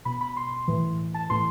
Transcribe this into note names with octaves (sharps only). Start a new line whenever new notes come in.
B2 B5
B5
C6
A2 E3
A5
A2 E3 C6